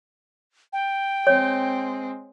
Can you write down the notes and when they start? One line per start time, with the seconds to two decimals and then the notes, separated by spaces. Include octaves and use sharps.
0.73 G5
1.27 G#3 C4 C#5